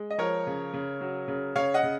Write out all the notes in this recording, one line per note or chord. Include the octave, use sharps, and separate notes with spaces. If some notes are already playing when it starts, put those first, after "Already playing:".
Already playing: G#3
D#5
F3 A#4 C#5
C#3
C#3
F#3
C#3
C#3 C#5 F5
D#5 F#5
C#3